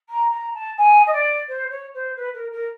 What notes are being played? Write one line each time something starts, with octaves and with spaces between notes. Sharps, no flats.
A#5
A#5
A5
G#5
D#5
D5
C5
C#5
C5
B4
A#4
A#4